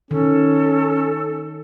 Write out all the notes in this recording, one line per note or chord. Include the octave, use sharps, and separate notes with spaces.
D#3 C#4 A4